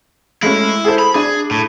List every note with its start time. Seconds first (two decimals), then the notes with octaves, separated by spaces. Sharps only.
0.42 G#3 A3 C#4 E4
0.85 G#4 A4 C5
0.99 B5
1.15 D4 G#4
1.51 A2